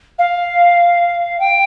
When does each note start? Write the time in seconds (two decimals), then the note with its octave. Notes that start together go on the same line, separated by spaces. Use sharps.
0.19 F5
1.40 G5